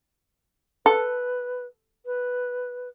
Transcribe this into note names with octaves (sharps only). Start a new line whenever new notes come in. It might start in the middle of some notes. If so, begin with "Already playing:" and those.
A4 B4
B4